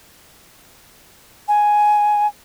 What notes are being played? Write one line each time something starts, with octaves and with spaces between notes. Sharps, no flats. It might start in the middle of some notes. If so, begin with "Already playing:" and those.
G#5